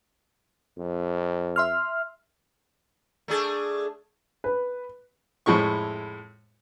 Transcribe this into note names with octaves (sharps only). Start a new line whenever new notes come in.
F2
E5 C6 F6
A3 D4 G#4
B4
F2 A2 G#3 E4 C#6